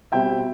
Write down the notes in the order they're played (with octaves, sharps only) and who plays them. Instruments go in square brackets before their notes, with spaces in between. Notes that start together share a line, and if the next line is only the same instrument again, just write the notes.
[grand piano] B2 G3 C4 E5 G5